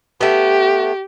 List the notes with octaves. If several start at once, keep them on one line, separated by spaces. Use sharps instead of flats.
A3 B3 G4